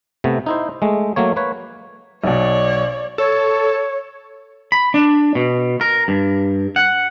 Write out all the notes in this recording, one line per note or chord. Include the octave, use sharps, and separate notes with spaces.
C3 A3 B3
D#4 E4 C5
G#3 A3
F#3 A3 A#3 C#5
A#3 B4 C#5
B1 B2 C#5 D5
A4 C#5
B5
D4
B2
A#4
G2
F#5